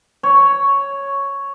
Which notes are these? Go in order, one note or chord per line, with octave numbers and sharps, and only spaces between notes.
C#5